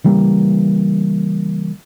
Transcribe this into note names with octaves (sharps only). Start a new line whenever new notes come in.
C#3 E3 G3 A#3